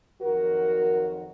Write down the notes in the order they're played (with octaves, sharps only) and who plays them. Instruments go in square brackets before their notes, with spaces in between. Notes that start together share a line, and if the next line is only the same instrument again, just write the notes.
[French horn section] F2 D#3 F#3 F#4 A#4